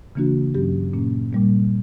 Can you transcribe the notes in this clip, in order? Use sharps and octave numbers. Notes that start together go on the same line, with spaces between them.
C#3 E3 A#3 D4 F#4
G2 F#3 C#4 G4
A#2 A#3 C#4
A#2 G3 A#3